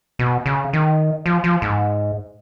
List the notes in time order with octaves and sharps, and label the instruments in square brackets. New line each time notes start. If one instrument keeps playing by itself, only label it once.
[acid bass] B2
C#3
D#3
F3
F3
G#2